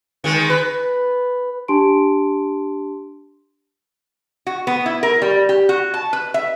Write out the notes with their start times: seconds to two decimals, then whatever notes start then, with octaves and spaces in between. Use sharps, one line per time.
0.24 D#3 G#3
0.50 B4
1.68 D4 G4 A5 C6 D7
4.47 F#4
4.67 B3
4.86 E4
5.03 A#4
5.22 G3
5.49 G4
5.69 F#4
5.94 A5
6.13 B4
6.34 E5